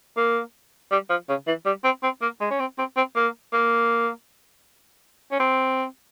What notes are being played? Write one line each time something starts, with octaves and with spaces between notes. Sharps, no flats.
A#3
G3
F3
C#3
E3
G3
C4
C4
A#3
G#3
C#4
C4
C4
C4
A#3
A#3
C#4
C4